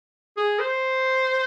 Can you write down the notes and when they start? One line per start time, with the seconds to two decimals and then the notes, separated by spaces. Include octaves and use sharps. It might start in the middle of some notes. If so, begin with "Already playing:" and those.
0.37 G#4
0.59 C5